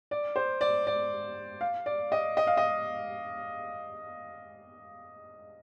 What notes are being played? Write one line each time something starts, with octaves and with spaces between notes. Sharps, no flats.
D5
C5
D5
D5
F5
D5
D#5
D#5
F5
D#5